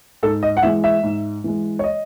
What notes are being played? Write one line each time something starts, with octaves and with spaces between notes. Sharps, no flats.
G#2 A4
D#5
F#5
E3 G#3 E5
E5
G#2
E3 G#3
C#5
D#5